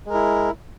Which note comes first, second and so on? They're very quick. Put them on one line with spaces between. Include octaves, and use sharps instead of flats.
G#3 A#4 E4